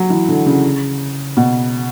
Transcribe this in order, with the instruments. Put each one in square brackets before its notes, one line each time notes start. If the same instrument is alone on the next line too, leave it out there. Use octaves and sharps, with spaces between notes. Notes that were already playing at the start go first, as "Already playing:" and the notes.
Already playing: [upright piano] F#3
E3
D3
C#3
B2